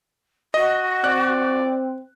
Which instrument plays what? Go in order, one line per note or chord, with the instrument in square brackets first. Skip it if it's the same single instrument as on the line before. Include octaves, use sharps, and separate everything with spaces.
[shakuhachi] F#4 [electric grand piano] D#5
[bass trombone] C4 [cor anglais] D5 [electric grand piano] F#6